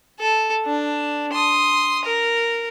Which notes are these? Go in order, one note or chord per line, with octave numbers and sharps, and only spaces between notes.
A4
D4
C6 D#6
A#4